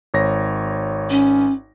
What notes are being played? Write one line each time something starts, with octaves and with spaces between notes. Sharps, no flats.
G#1 C#5 A#6
C#4